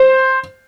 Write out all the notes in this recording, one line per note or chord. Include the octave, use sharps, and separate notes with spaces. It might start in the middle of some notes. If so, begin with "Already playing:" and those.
Already playing: C5